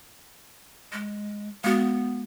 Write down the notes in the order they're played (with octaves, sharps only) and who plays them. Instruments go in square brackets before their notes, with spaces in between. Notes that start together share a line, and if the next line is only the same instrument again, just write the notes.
[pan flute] G#3
[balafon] G#3 F#4 [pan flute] B3